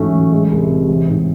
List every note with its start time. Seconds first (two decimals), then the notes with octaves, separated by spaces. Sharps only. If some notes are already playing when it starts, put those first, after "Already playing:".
Already playing: A1 G#2 F#3 A3 C#4
0.13 A1
0.32 G#3
0.51 C2
0.69 C3
0.88 A1
1.08 G#2